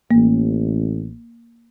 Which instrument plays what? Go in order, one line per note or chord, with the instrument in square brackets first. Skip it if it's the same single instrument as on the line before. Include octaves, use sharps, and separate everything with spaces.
[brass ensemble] A1 [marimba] A#3